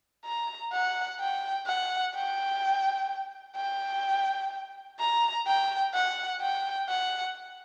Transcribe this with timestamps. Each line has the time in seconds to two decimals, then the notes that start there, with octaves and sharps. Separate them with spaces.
0.26 A#5
0.73 F#5
1.20 G5
1.67 F#5
2.15 G5
3.56 G5
4.99 A#5
5.47 G5
5.94 F#5
6.41 G5
6.89 F#5